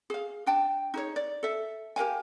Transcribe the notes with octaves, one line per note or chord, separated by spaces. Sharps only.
G#4 F5
D4 G5 A5
D#4 G#4 C#5
D5
A4 E5
G4 A#4 F5 G#5